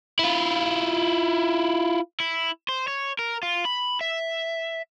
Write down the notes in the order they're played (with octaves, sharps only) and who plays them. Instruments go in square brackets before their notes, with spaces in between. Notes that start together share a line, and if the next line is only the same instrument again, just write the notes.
[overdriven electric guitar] E4 F4
E4
C5
C#5
A#4
F4
B5
E5